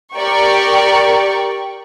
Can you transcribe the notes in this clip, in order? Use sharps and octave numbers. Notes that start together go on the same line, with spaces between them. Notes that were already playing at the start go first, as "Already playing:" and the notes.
G4 A#4 D5 G5 C#6